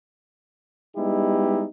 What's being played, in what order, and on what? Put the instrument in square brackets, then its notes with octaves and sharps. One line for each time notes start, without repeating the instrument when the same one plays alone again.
[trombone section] G3 G#3 B3 D#4 E4 G4